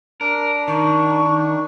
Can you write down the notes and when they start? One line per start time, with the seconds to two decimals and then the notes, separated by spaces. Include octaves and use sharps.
0.21 D4 A#4
0.68 D#3 C#6